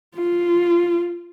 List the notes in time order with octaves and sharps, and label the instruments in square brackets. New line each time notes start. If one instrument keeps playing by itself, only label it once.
[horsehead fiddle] F4